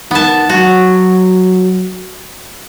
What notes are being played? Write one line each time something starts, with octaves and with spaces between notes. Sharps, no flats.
D#3 B3 A5
F#3 F#4